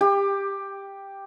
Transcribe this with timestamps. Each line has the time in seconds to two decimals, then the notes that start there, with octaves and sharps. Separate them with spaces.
0.01 G4